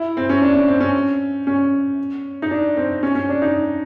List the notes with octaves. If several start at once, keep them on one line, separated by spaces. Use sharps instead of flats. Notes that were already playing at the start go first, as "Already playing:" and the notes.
Already playing: E4
C4
C#4
D4
C#4
C4
C#4
C#4
D#4
D4
C4
C#4
C#4
D4
D#4